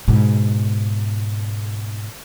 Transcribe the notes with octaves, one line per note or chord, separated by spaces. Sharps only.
G#2 B2